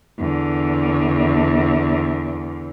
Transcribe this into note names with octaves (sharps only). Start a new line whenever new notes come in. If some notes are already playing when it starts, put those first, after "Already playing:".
E2 D3